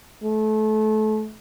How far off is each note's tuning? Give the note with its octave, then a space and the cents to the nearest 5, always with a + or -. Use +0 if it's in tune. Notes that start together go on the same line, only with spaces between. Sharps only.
A3 -30